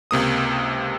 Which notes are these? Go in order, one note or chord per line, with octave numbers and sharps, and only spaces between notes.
C#2 C3 A#3 D#6